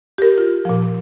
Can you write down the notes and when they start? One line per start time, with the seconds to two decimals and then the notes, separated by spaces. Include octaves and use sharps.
0.18 G4 A#4
0.38 F4
0.65 A#2 F3